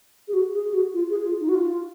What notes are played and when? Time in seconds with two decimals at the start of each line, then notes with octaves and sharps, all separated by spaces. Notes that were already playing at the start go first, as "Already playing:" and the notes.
0.28 G#4
0.33 F#4
0.54 G#4
0.69 G#4
0.74 F#4
0.94 F4
1.10 G#4
1.25 F4
1.41 D#4
1.49 F#4
1.55 F4